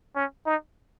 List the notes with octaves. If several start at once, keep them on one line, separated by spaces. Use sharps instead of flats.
C#4
D#4